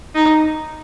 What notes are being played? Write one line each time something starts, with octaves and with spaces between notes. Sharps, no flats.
D#4